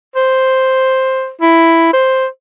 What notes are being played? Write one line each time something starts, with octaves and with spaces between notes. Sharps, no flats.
C5
E4
C5